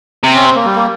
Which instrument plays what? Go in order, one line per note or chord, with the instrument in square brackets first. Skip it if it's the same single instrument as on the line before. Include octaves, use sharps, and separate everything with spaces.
[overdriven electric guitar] C3
[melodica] C#4
C4
A#3
G3
A#3